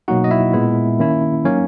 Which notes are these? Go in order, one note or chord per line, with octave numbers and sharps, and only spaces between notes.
B2 F#3 A#3 D#4 F#4 F#5
D#5
E4 E5
A#2 G#3 B3 E4
D#3 A#3 C#4 E4
F#3 A#3 C#4 D#4 C#5